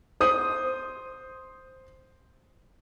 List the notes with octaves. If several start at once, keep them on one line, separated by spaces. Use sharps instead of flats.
C5 D#6